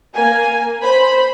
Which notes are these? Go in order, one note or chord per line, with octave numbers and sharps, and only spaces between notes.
A#3 G#5
C5 B5